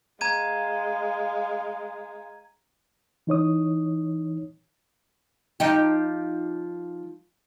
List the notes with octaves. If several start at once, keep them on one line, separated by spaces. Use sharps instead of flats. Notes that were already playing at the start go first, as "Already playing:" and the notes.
G#3 F5 A#5 G#6 D#7
E3 D#4 C#5 D#6
F3 D#4 G4